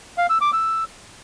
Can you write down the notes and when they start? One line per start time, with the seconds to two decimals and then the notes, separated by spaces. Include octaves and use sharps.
0.18 F5
0.29 E6
0.41 D6
0.53 E6